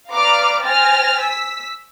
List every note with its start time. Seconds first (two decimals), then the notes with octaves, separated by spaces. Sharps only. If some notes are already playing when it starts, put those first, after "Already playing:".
0.12 B4 D5 F5 A#5 D6 F6
0.62 C5 G5 G#5 F6 A6 A#6
1.20 E6 B6